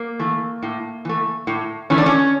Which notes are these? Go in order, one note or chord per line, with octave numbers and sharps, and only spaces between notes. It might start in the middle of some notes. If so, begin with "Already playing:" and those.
Already playing: A#3
E3 A3
A2
E3 A3
A2
E3 A3 C#4
D4
C#4